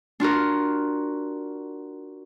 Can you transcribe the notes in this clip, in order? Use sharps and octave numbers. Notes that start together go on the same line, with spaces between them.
D4 F4 F#4 A#4